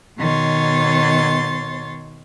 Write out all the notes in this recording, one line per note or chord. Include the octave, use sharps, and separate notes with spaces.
B2 D#3 C#5 C6 A6